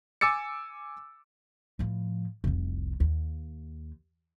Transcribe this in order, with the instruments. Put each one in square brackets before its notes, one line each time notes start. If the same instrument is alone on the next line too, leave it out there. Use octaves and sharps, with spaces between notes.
[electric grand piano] G#5 D6 E6 A6 C#7
[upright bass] A2 F3
F1 C2
D#2